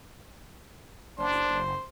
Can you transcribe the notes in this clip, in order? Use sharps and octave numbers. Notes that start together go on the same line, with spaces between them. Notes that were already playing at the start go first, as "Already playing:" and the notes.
F#1 D4 C5